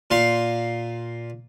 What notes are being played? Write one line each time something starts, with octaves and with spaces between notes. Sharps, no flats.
A#2 F5 C6